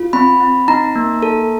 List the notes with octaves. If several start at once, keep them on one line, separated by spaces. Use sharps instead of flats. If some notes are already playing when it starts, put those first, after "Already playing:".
Already playing: F4
C4 B5
C4
D#4 A#5
A#3
A4